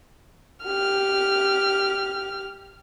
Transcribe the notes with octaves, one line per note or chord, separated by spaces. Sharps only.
G4 F6